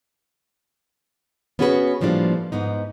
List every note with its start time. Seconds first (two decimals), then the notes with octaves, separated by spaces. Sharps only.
1.59 B3 C#4 F#4 G#4 A#4 B4
2.01 A2 F3 G3 A#3 D4
2.52 G#2 B3 D#4